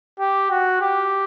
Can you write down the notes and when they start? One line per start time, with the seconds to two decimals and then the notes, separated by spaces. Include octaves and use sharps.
0.20 G4
0.51 F#4
0.81 G4